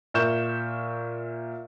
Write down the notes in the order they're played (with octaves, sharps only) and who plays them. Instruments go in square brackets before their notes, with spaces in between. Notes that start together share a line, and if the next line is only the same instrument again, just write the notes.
[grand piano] A#2 A#4 E5 C#6 G6 E7